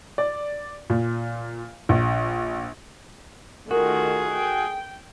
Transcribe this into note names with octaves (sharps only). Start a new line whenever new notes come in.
D5
A#2
A#1
D#3 A3 F4 F#4 G#4 A#4
G5